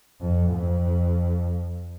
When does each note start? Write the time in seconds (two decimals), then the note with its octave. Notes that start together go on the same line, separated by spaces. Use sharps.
0.21 F2
0.52 F2